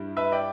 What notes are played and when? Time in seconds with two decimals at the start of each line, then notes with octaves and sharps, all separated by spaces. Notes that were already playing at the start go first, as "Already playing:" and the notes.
Already playing: G2 G3 E4
0.17 B4 E5
0.32 D5 G5